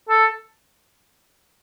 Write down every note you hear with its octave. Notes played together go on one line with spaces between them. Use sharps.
A4